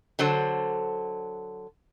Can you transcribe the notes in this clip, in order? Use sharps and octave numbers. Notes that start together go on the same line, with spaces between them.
D3 F#3 A4 C5